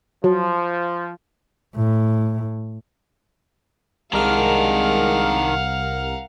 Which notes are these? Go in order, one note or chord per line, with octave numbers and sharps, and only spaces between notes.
F3 F#3
A2
C2 D#3 G#3 D4 A#4 F5 F#5 F6